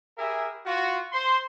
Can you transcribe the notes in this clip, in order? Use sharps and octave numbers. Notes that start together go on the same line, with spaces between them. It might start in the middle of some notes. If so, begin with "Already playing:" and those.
E4 G4 G#4 A#4 E5
F4 F#4
C5 C6